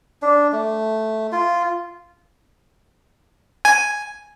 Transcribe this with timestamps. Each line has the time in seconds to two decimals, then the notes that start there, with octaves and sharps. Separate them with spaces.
0.22 D4
0.53 A3
1.32 F4
3.65 G#5